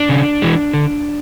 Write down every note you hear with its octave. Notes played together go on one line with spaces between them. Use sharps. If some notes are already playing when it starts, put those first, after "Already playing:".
Already playing: D4
C#3
E3 G#3
D3